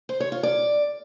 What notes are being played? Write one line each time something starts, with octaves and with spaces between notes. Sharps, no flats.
C5
C#5
F4
D5